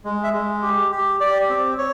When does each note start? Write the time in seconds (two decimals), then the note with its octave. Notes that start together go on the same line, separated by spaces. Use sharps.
0.05 G#3
0.24 E5
0.33 G#3
0.62 G4
0.91 G4
1.20 G4 D5
1.50 C4
1.78 C#5